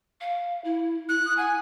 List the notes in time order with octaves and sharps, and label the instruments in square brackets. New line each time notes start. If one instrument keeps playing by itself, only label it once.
[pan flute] F5
E4
[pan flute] E4 [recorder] F#6
[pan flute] D#6
[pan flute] F#5 [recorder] G#5